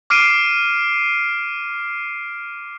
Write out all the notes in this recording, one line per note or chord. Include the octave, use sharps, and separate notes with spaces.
D6 F6 C7 D7 D#7